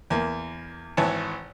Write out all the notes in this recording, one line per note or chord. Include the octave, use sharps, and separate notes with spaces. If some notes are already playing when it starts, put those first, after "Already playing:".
E2 A#3
G#1 E3 C#5 A5